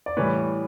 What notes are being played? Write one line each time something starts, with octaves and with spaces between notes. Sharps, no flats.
D5
A2 E3 G3 B4 C#5